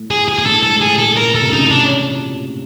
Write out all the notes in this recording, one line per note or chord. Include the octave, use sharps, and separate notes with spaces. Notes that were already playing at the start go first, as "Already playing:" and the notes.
Already playing: A2
G#4
G#4
G#4
A2 A4
A4
G#2
G#4
A#2
A4
A#4
A4
C3
C#3 D#4
D4